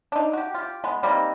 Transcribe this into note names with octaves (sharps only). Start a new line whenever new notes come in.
D4 D#4
F#4 G4
F4 G4
G#3 B3
G3 A#3 C4 D#4